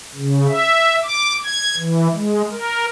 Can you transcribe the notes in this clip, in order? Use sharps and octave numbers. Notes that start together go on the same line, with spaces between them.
C#3
E5
D6
G#6
E3
G#3
A#4